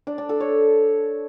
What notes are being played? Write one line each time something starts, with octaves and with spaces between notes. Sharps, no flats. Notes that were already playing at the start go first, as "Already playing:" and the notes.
D4
D4
A4
C#5